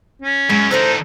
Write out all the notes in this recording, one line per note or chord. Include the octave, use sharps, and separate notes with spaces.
C#4
F#2 G#3
A2 D3 D#4 A4 C5 E5